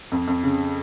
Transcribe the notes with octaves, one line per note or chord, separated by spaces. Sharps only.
F2
F2
C#3